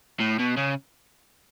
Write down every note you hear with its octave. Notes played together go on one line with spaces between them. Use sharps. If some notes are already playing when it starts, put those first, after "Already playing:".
A2
B2
C#3